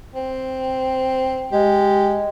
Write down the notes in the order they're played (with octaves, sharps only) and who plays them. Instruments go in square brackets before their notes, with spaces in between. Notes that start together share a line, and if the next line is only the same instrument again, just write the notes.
[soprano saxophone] C4
[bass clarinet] G#3 [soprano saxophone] G4